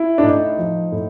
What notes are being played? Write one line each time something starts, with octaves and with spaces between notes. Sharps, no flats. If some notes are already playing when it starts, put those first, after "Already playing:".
Already playing: E4
D4
A2 D#4
F3
A2